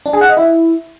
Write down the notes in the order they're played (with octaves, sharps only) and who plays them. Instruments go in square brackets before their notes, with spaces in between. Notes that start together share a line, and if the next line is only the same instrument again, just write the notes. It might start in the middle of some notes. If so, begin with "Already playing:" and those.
[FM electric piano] D4
G#4
F#5
D#5
E4